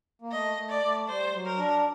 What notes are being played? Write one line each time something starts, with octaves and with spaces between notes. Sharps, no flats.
A#3
A3 D#5
A3
D5
A3
G3 C5
F#3
A#4
D4